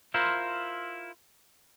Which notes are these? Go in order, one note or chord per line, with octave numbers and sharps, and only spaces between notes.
E4 F4 A#4 C5